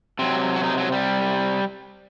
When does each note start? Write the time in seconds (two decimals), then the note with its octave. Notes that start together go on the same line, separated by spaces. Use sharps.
0.19 C3 F#3 C4
0.56 F#4
0.63 D#4
0.78 F#3
0.92 G3